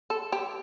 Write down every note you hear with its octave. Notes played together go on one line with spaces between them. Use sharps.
A4
G4